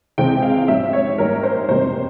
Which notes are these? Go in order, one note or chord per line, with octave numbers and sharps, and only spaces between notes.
C#2 C3 E3 G#3 C4 G5
F5
A#1 G#2 G3 C#4 E5
C#5
G#2 G3 A#3 C#4 A#4
C5
F1 E2 C3 G3 C5